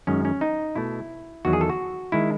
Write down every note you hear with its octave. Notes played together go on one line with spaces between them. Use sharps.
F#2 D#3 G#3 C#4
C#4
D#4
B2 A3 E4
E2 D#3 F#3 F#4
G#4
A4
F#4
D#3 G#3 E4